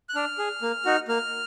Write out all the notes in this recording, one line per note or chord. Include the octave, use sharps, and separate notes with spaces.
F#6
D4 F6
G#4
A#3
D#4 F#4
A#3 F6